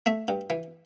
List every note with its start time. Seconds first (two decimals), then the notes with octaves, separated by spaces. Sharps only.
0.06 A3 E5
0.28 G2
0.50 E3